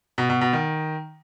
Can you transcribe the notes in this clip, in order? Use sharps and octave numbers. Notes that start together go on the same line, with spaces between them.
B2
B2
B2
D#3